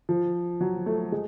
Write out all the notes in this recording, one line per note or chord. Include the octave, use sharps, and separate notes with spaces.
F3
F#3
A3
G#3